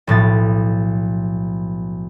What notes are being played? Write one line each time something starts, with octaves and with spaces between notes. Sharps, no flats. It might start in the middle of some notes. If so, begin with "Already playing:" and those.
B1 A2 F3 A6